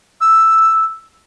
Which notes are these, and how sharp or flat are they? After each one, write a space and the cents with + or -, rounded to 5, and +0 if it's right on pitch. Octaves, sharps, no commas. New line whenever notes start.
E6 +0